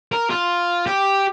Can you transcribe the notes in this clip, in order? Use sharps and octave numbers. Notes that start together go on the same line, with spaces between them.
A#4
F4
G4